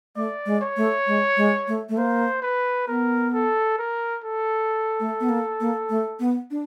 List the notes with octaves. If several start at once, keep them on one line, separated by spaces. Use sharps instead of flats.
A3 D5
G#3
C#5
A3
G#3
G#3
A3
A3
A#3 C5
B4
B3 A#4
A4
A#4
A4
A3
B3
A#3
A#3
A3
B3
D4